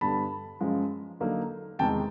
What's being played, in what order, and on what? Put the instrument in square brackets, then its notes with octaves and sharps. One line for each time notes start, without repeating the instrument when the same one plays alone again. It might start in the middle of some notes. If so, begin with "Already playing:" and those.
[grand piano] G2 D3 G3 B3 A5 B5
F#2 C#3 F3 G#3
D3 F#3 A#3 D#4
E2 C3 D#3 G#3 G5 A5